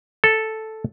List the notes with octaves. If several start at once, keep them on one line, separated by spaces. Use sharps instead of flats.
A4